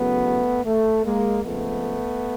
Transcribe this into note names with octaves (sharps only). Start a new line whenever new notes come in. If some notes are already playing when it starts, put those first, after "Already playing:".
Already playing: E2 C#3 F#3 A3 B3
A3
G#3 A#3
F2 C#3 F3 G#3 A3 B3